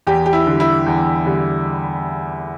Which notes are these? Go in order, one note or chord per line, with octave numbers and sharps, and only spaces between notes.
E2 G4
G4
E4
D3 G3
E4
E2
D3 G3